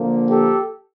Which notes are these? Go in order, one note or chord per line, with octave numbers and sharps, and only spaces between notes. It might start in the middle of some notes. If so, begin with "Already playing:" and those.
Already playing: D3 F3 A#3
G4 A4